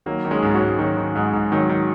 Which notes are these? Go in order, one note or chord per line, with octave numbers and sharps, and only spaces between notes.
D#3 F#3 A#3
D#3
G#3 C#4
G#2
C#4 F#4
G#2
D#3 F#3
D#3
G#2 G#3
G#2
D#3 F#3
D#3